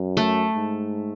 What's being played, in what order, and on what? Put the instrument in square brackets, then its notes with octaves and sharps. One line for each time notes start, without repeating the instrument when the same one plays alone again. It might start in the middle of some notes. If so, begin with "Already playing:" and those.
Already playing: [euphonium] F#2
[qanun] A3
[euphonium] G#2